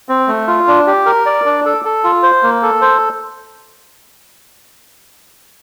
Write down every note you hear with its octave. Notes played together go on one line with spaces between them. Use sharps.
C4
A3
F4
D4
G4
A#4
D5
D4
A4
A4
F4
C5
A#3
A4
C5